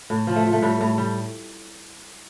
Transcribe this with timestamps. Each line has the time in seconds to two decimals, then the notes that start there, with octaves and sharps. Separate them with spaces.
0.10 A2
0.27 F3
0.36 A3
0.45 F3
0.53 A3
0.62 A2 G3
0.81 A2
0.98 G3